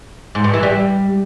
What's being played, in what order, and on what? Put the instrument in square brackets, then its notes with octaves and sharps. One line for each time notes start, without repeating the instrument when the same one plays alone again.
[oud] G#2
G2
E3
G3